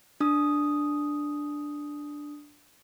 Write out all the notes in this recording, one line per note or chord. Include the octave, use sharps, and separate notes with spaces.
D4 D#6